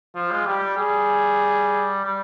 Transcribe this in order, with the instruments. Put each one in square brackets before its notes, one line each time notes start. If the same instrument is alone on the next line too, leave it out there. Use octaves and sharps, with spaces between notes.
[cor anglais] F3 [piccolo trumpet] F4
[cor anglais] G#3
[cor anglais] G3 [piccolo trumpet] G4
[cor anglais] G3
[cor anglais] G3 [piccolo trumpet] G#4
[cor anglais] G3